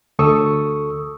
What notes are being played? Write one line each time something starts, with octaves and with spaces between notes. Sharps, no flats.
D2 A4 C#6 D#6 E6